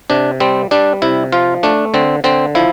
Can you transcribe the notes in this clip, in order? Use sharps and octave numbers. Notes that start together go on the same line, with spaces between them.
C3 D4
G3 C4
G3 D4
C3 E4
F3 F4
A3 D4
D3 C4
D3 C4
F3 E4